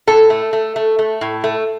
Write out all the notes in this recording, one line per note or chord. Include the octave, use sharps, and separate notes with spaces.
A2 A4
A3
A3
A3
A3
A2
A3